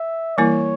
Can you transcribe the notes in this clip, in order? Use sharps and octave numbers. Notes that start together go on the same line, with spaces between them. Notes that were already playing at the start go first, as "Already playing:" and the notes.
Already playing: E5
E3 G3 A#3 E4 A#4 C#5